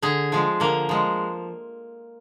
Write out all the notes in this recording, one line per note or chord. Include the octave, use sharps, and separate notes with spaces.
D3 G#4
F3 G#3
D3 A#3
F3 G#3